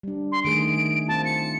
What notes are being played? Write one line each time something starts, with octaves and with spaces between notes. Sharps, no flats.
G3 D4
C6
D#3 A3 G#4 D7
C4 F4 A5
C#7